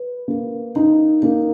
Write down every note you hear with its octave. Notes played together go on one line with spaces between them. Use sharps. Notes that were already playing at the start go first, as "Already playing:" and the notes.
Already playing: B4
A#3
D#4
A#3